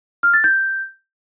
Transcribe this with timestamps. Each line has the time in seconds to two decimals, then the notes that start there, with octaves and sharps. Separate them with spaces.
0.23 F6
0.34 A6
0.44 G6